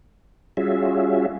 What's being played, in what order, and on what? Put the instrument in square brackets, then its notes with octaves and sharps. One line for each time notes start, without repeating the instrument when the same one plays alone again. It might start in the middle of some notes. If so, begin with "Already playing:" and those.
[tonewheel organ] G3 C#4 F4 F#4 G#4 E5